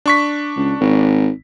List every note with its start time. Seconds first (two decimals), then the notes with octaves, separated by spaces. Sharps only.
0.06 D4 C#6 B6
0.56 C#2
0.80 G#1